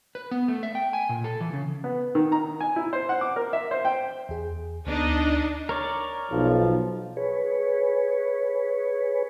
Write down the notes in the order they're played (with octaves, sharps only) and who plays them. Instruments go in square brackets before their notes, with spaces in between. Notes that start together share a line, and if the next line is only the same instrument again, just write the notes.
[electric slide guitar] B4
B3
A3
E5
G5
G#5
A#2
A4
E3
C#3
[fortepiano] B3
D#3
A#5
G#5
E4
C5
F#5
D6
A#4
E5
C5
G5
[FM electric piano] E2 G#4
[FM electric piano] D2 B3 [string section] D4 D#4 D#5
[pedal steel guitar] A#4 C#5 D5
[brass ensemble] B1 F3
[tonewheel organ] G#4 B4 C#5